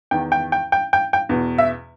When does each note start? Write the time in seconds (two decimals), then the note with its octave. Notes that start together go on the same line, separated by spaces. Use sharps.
0.11 E2 D#3 G5
0.32 G5
0.52 G5
0.72 G5
0.93 G5
1.13 G5
1.29 E2 B2
1.58 E5